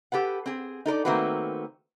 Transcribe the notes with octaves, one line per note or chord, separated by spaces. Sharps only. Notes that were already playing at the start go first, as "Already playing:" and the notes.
G4 A4 B4 F#5
C4 G#4
D#4 A4 A#4 D5
D#3 A3 A#3 C4 F#4 B4